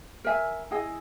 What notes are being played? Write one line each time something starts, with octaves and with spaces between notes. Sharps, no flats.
A#4 E5 G#5
E4 G#4 D#5 G#5